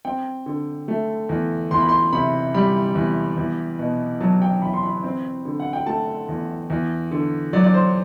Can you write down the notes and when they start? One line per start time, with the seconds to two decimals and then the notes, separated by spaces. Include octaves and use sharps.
0.05 C4 G5
0.46 D3
0.88 A3
1.29 E2
1.71 E2 C6
1.80 B5
1.89 C6
2.13 C3 B5
2.54 G3 B5
2.95 E2
3.37 E2
3.79 B2
4.21 F#3 A5
4.42 G5
4.62 E2 B5
4.74 C6
4.83 B5
5.04 C4
5.45 D3
5.60 F#5
5.73 G5
5.86 A3 A5
6.28 E2
6.70 E2
7.11 D3
7.53 F#3 D5
7.64 D5
7.74 C5